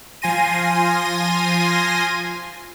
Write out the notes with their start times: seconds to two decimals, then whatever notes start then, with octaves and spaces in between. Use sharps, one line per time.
0.22 F3 F4 G#5 C6 A#6 D#7